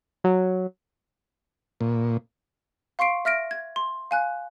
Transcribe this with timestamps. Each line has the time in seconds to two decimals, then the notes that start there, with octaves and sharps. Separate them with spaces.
0.24 F#3
1.81 A#2
2.99 F5 C6 C#6 C7 D7
3.25 E5 F6 A#6 D7
3.51 G#6
3.76 C6
4.11 F5 G#5 F#6